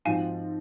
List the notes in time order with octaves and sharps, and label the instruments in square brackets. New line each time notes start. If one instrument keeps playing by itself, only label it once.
[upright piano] G#2 F3 C4 F#4 [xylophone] F5 G#5